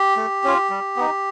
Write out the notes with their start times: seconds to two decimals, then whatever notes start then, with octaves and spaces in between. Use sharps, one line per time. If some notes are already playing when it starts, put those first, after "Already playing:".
Already playing: G4
0.16 A3
0.44 C#4 F4
0.70 G3
0.96 B3 D#4